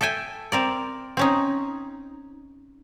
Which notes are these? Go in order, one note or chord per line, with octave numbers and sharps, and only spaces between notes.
A4 E5 G5 G#5
C4 A#4 D5
C4 C#4 D#4